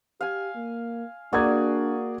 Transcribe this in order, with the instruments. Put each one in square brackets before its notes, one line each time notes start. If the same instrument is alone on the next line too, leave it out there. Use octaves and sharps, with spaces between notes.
[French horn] G4 [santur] F5 G#5
[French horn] A#3
[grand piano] A#3 A#4 G#6 [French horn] D4 [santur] F#4 G#4 D5